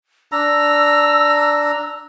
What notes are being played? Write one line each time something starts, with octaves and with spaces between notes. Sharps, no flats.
D4 A#5 E6